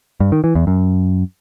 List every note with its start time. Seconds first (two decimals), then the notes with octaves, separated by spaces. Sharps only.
0.20 G2
0.32 D#3
0.44 E3
0.55 E2
0.67 F#2